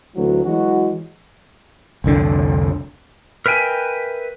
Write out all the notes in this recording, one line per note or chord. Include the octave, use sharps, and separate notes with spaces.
D2 E3 F#3
E3 F#3 G#3 F#4
F1 C2 D3 D4
A#4 B4 E5 G5 G#5